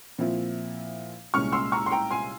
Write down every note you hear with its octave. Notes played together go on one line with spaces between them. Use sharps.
A#2 F3 C4 E4
C2 A#2 G#3 C#4 C#6 F6
C6 E6
A#5 C#6
C6
G5 A#5
G#5 C6